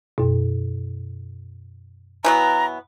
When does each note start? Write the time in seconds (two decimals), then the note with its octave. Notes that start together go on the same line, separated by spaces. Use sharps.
0.18 F#2 B2
2.24 E3 F#3 B3 A#5